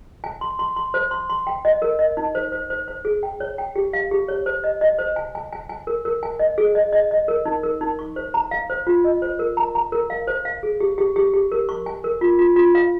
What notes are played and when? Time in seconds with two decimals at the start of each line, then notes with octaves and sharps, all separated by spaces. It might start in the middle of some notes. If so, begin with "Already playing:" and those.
0.24 G#5
0.41 C6
0.59 C6
0.76 C6
0.94 C5
1.11 C6
1.30 C6
1.47 G5
1.65 D#5
1.82 A#4
1.99 D#5
2.17 D#4
2.35 C5
2.52 C5
2.70 C5
2.88 C5
3.05 G#4
3.23 G5
3.40 C#5
3.58 G5
3.76 G4
3.93 F5
4.11 G4
4.28 C#5
4.46 C5
4.64 D#5
4.81 D#5
4.99 C5
5.16 G#5
5.35 G#5
5.52 G#5
5.69 G#5
5.87 A#4
6.05 A#4
6.23 G#5
6.39 D#5
6.58 G#4
6.75 D#5
6.93 D#5
7.11 D#5
7.28 A#4
7.46 D#4
7.63 A#4
7.81 D#4
7.99 C#6
8.16 C5
8.34 A#5
8.51 F5
8.70 C5
8.87 F4
9.04 D#5
9.22 C5
9.39 A#4
9.57 A#5
9.75 A#5
9.92 A#4
10.10 F5
10.27 C5
10.45 F5
10.63 G#4
10.80 G4
10.98 G4
11.16 G4
11.34 G4
11.52 A#4
11.69 C#6
11.86 G#5
12.04 A#4
12.21 F4
12.39 F4
12.56 F4
12.75 F5